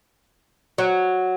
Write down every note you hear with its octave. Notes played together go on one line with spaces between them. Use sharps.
F#3